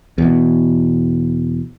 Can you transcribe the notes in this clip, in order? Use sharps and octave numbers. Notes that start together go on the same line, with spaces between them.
E2 B2